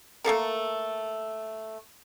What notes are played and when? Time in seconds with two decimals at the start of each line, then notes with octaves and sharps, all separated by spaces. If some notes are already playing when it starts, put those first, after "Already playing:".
0.24 A3 A#3 A4 A#4